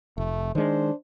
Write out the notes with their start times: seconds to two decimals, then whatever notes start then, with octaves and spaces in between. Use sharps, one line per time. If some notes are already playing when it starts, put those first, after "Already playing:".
0.18 F1 A3
0.55 D#3 G#3 D4 C5